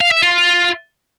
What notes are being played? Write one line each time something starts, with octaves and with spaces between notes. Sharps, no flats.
F5
E5
F4